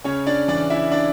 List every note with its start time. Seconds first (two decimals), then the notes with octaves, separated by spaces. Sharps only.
0.04 C#3 C#4 C#5
0.27 D4 D5
0.48 E3 D4 D5
0.70 E4 E5
0.92 D4 D5